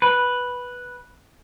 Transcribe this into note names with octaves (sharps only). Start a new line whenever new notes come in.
B4